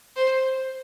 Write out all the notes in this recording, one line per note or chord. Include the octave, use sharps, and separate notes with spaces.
C5